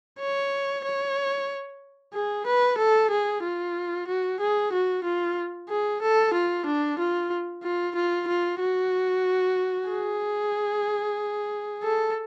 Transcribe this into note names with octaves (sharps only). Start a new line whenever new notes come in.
C#5
C#5
G#4
B4
A4
G#4
F4
F#4
G#4
F#4
F4
G#4
A4
F4
D4
F4
F4
F4
F4
F#4
G#4
A4